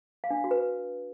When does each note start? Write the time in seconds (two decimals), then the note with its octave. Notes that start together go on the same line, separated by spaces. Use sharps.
0.24 F5
0.30 D4
0.37 F5
0.44 F#4
0.51 B4